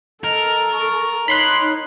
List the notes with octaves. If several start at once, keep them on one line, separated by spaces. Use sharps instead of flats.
A4 A#4 D#5
C#6
D#4 C#5 B5 C6 F#6